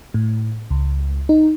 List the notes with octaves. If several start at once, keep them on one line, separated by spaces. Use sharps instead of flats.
A2
C#2
D#4